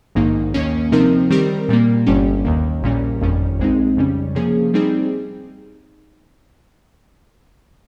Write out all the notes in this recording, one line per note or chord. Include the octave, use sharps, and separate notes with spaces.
A#1 G#2 D#3 A#3 D#4
D#2 D#3 A#3 C#4
C3 F3 C4 D#4 A#4
D#3 G3 C4 G4 A#4
A#2 G3 A#3
G1 G2 G3 C#4 G4
D#2 D#3 A#3
A#1 A#2 G3 A#3 C#4
G1 F2 D#3 G3 C#4
A#1 A#2 G#3 C4 D#4
F2 C#3 G3 C#4
C3 F3 A#3 C#4 G#4
G3 C4 D#4 G#4